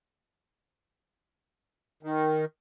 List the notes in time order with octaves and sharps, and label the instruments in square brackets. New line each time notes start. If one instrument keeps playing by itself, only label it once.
[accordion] D#3